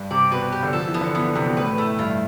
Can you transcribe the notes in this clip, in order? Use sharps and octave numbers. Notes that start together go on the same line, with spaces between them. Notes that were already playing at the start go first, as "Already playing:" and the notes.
Already playing: G2
C3 D5
B2 B4
B2
G4
D3
F3 A4
E3
B3
D3
E3 B3
E3
C3 B3
B2
A2 B4
A3
G2 F4